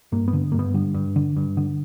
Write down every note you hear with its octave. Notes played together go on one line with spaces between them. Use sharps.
G2 A#3
B3
D3
G2 A#3
B3
D3 G3
G2
D3
G2
D3